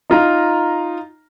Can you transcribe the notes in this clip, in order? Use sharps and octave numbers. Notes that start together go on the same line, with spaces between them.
D#4 F4 A#5